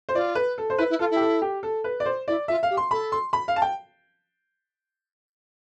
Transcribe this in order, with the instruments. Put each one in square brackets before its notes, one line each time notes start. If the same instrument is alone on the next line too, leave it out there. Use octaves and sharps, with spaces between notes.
[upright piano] C5
[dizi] F4 [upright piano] D5
[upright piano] B4
A4
C5
[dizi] E4 [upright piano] B4
[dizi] E4
[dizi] F4 [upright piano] A4
[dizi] E4
[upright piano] G4
A4
G4
A4
B4
D5
C5
[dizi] E4 [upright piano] D5
[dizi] F4 [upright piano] E5
[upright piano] F5
[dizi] G4
[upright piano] C6
[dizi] A4 [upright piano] B5
[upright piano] C6
B5
F5
A5
G5